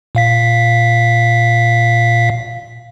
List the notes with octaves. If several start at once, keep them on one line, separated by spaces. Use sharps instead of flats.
A#2 F5 B6